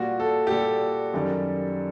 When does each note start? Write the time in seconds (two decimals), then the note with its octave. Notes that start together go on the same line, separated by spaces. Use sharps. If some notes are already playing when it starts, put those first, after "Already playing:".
Already playing: A#2 G3 F#4
0.20 A4
0.47 G4
0.51 A#2 G3 A4
1.14 F#2 D#3 G3